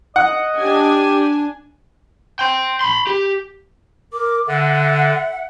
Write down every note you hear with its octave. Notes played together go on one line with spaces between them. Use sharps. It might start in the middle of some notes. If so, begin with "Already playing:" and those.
D#5 F#5
D4 G4 G#5
G5 C6
B5 C6
G4
A#4 D6
D3 E5 F#5